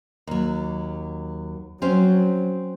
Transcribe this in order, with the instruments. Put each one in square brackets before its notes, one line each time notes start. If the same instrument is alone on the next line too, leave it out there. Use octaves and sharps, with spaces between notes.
[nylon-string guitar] D#2 F#3
[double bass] F#3 [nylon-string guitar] C4 C#4 C5